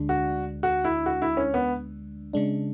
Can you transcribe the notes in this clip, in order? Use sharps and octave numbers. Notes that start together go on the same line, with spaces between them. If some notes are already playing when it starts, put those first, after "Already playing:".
Already playing: D2 D3 G#3 D4
F#4
F#4
E4
F#4
E4
C#4
B3
C#3 G#3 D4